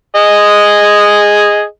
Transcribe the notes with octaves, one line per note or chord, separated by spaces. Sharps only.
G#4 D#5